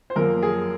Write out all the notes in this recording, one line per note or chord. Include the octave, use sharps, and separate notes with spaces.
C5
F#2 F3 A#3 A#4
G#4